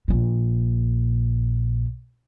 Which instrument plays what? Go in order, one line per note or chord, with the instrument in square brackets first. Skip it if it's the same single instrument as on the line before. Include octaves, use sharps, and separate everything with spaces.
[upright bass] A#1 A#2